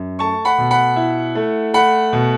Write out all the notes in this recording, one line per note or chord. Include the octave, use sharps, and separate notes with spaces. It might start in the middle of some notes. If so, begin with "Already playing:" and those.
Already playing: F#2
A3 A5 C#6
F#5 B5
B2
F#5 B5
E4
A3
A3 F#5 B5
B2